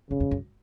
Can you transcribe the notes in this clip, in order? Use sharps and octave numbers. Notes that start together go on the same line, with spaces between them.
F2 C#3
F2
F#2